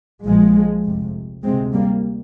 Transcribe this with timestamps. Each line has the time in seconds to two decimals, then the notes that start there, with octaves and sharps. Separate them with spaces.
0.25 A#1 A#2 F3 G#3
0.85 F1 F2 C3
1.44 D2 C3 G#3 C4
1.74 G3 A#3